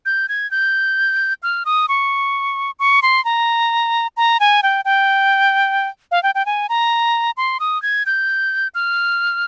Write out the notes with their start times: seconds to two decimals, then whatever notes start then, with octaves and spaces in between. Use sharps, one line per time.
0.06 G6
0.29 G#6
0.51 G6
1.43 F6
1.65 D#6
1.89 C#6
2.79 C#6
3.02 C6
3.25 A#5
4.17 A#5
4.40 G#5
4.63 G5
4.85 G5
6.11 F5
6.23 G5
6.35 G5
6.46 G#5
6.69 A#5
7.37 C6
7.60 D#6
7.82 G#6
8.06 G6
8.75 F6